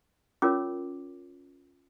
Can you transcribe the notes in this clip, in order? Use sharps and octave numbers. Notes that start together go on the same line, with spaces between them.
C#4 F4 A#4 C#5 D6